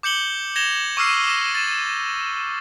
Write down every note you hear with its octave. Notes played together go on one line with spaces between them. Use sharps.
D6 G6 C#7 F#7 G7
G#6 A#6 E7 F7 G7
C#6 D6 E6 F6 C7 D#7
D6 A#6
A6 E7